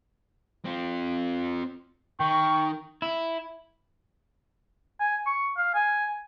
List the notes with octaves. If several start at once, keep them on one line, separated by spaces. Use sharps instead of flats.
C4 F4
D#3 G5 C#6
E4
G#5
C#6
F5
G#5